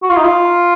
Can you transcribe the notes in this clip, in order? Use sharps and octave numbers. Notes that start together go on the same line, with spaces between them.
F#4
F4
D#4
F4